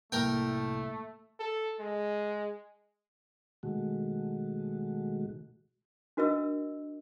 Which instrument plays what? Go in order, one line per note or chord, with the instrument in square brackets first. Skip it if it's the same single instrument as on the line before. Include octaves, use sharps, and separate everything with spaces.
[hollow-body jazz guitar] C2 A2 [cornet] A3 [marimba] A#3 [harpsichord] A#4 G5
[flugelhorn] A4
G#3
[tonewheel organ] B2 D#3 G#3 A3 F#4
[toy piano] D4 F#4 A#4 D#5 E5 E6